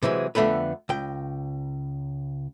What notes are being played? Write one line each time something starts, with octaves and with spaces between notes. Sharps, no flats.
C3 E3 F#3 G#3
F2 D3 A3 B3 B4
C#2 G5